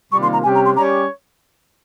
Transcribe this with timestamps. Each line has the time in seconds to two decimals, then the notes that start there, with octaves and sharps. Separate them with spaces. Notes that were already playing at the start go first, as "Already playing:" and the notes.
0.12 C3 D#3 G3 A#3 F4 C#6
0.22 C6
0.33 A#5
0.43 C3 G3 C#4 G4 G#5
0.55 A#5
0.65 C6
0.76 G3 C#4 G4 C#5 A#5